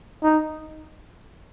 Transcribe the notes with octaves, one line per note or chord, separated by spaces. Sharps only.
D#4